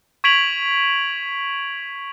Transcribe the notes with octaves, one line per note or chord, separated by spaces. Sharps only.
C#6 G#6 B6 D7 F7 F#7